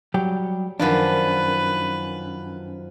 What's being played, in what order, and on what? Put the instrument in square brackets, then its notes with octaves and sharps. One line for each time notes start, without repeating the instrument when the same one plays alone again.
[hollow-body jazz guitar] F#3 G3 G4
[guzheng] F#2 D#3 F3 [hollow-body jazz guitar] D4 [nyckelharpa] B4